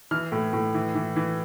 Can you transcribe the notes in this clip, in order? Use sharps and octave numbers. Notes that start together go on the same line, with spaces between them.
E3 F6
A2
A2
E3
E3
E3